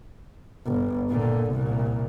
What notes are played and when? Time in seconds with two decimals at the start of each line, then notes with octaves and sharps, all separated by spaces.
0.66 G1
1.10 A#2 D3
1.51 C2 A#2